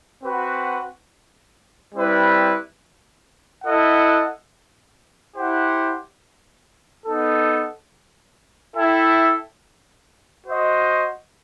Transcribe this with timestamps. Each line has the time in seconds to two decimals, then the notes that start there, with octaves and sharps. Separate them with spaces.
0.23 C4 F#4 B4 F#5
1.93 G3 C4 E4 B4
3.64 E4 A4 D#5 F#5
5.34 E4 G4 C5 F#5
7.05 B3 D#4 A4
8.75 E4 A4 E5 G5
10.46 F#4 C5 D#5